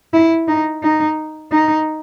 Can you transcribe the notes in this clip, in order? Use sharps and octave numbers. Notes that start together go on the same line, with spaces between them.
E4
D#4
D#4
D#4